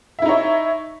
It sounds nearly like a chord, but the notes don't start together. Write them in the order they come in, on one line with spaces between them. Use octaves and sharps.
E5 E4 D#4 C#5